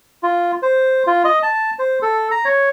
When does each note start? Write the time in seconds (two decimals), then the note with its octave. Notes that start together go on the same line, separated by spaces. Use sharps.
0.23 F4
0.62 C5
1.07 F4
1.25 D#5
1.43 A5
1.79 C5
2.02 A4
2.31 A#5
2.45 C#5